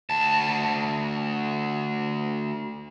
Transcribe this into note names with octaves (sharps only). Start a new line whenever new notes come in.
D2 A5